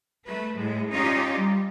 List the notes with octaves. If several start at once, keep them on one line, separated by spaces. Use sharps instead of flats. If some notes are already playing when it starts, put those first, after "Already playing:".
A3 B4
A2 G#3
C#4 D#4 F4 G4 D5 D#5
G3